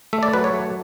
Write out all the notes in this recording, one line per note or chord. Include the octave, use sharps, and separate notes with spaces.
A3 E5
D5
F#3 B4
C#5
A3